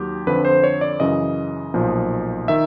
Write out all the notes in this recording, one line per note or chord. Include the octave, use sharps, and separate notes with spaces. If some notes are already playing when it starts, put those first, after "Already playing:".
Already playing: D#2 F#3 G4
F2 D3 F3 B4
C5
C#5
D5
F#2 C#3 E3 D#5
B1 A#2 F3
D#3 E5